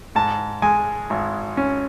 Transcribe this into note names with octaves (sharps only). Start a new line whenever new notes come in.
G#2 A5
G#3 G#5
G#1
C#4